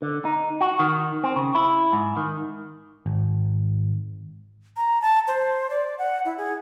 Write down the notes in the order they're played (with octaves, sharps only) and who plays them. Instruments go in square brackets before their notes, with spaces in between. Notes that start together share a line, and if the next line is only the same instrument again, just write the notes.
[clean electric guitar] D3
D#4
F#4
D#3
C4
C#3
E4
G#2
D#3
[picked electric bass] G#1
[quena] A#5
A5
C5
D5
F#5
E4
G#4